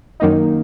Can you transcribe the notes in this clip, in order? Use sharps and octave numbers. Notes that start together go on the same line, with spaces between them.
F#2 D#3 A#3 D#4